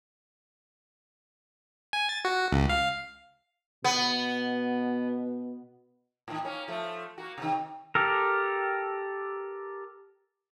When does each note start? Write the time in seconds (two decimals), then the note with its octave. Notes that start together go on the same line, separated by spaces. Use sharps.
1.93 G#5
2.09 A6
2.25 F#4
2.52 C#2
2.69 F5
3.84 B2 B3
6.28 A2 D#3
6.45 A#3 C#4
6.68 F3 A3
7.18 A#3 F#4
7.38 C3 D#3
7.95 G4 A4 A#4